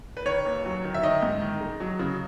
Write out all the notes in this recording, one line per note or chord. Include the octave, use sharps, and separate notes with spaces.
B4
D#3 C#5
D#2
F#3
D#3
E5
D#3 D#5
G#2
D#3
G#3
F#3
C#3